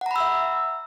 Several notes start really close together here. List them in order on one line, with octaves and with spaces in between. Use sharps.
F#5 A#5 B5 E6 E5